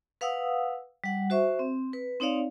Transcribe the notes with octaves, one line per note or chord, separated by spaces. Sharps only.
B4 F5 F#5 D#6 E6
G3 F#5
F#4 C5 E5 C#6
C4
B4
C4 D#4 C#5 D5 F5